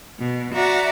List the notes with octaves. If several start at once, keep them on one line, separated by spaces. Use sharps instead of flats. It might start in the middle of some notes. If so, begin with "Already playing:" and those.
B2
F#4 D5 E5 A#5